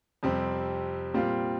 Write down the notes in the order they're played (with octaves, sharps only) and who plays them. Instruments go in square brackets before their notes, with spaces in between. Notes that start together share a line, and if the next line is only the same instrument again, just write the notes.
[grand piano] F2 C3 G3 C4
A#2 G3 C4 F4